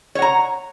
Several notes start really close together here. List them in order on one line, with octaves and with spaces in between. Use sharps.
C#5 F#5 A#5